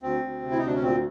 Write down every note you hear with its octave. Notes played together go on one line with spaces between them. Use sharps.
D2 C4
D2
C3
E4
D#4
D2 D4
C#4
A#2 C4